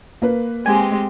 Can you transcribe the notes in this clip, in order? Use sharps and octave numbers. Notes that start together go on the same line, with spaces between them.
A#3 B4
G#3 C4 G4 G#5